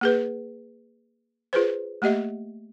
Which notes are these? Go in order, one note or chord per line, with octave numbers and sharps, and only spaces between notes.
A#3 G#4 B4
F4 G#4 B4 C5
A3 A#3 G4 D#5 E5